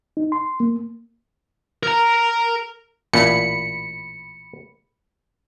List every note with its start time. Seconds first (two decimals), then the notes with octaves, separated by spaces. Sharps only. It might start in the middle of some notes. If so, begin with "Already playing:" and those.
0.17 D#4
0.32 C6
0.60 A#3
1.83 A#4 A#5
3.13 A1 A#2 B5 C#7